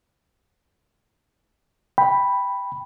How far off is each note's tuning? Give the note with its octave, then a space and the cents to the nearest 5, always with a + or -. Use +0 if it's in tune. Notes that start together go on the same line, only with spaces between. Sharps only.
G5 +10 B5 +0